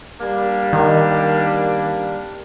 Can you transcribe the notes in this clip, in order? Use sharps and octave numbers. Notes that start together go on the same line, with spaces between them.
G3 A#3 D4
D#3